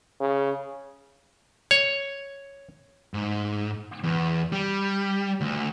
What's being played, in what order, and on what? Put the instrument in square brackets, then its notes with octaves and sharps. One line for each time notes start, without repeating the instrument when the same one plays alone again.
[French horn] C#3
[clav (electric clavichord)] C#5
[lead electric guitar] G#2
E2
G3
D2